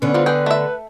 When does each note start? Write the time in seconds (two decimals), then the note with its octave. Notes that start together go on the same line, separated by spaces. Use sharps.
0.02 D3 B3 C#4
0.14 G3 C4 F4
0.26 G#4 B4 G5
0.46 A3 E5